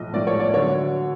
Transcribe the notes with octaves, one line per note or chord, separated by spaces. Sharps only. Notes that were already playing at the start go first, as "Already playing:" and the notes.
Already playing: B1 A2 F3 D#5
B1 A2 F3 D5
C#5
D5
D3 F#3 C#5